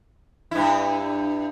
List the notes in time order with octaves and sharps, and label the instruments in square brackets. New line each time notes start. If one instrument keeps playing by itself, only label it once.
[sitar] G2 E4